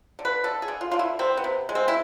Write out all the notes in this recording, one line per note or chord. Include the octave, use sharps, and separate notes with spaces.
D3
B4
D3 A4
G#4
D3
F4
D3 F4
E4
C3 C4
B3
C3
G#3
C4
E4